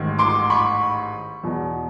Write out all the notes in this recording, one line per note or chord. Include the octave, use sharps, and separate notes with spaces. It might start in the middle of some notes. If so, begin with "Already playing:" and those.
Already playing: A1 G#2 D#3
C6 D6
B5 C#6
E2 B2